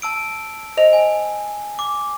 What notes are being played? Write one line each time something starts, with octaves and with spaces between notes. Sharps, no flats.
A5 E6 D7
C5 D#5 F7
G#5
D6